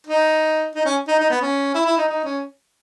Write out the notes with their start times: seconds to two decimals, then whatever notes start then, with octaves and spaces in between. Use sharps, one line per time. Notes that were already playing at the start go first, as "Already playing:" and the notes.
0.07 D#4
0.75 D#4
0.85 C#4
1.08 D#4
1.19 D#4
1.30 B3
1.42 C#4
1.75 E4
1.85 E4
1.98 D#4
2.09 D#4
2.24 C#4